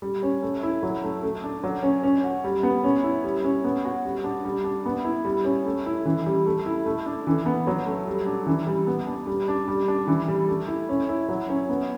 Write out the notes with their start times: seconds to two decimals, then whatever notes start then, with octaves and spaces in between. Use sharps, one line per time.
0.02 G3
0.23 C#4
0.42 A3
0.63 E4
0.83 F#3
1.03 A3
1.23 A3
1.44 D4
1.64 F#3
1.83 C#4
2.03 C#4
2.24 F#4
2.44 G3
2.63 B3
2.84 C#4
3.03 E4
3.24 G3
3.44 C#4
3.64 B3
3.85 F#4
4.05 G3
4.24 D4
4.45 G3
4.64 D4
4.86 B3
5.04 E4
5.25 G3
5.45 C#4
5.66 A3
5.86 E4
6.05 E3
6.26 G3
6.46 A3
6.66 E4
6.86 A3
7.06 D4
7.27 E3
7.46 B3
7.67 F#3
7.86 A3
8.07 G3
8.26 D4
8.47 E3
8.67 G3
8.87 B3
9.07 D4
9.27 G3
9.48 D4
9.68 G3
9.88 D4
10.07 E3
10.28 G3
10.49 A3
10.68 E4
10.89 C#4
11.09 E4
11.29 F#3
11.49 C#4
11.69 B3